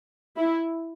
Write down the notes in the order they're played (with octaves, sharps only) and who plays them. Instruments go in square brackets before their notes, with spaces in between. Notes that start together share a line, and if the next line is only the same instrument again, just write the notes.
[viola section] E4